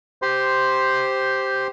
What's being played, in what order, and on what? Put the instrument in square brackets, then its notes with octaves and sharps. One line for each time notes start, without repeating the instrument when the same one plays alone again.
[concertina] G4 C5 C6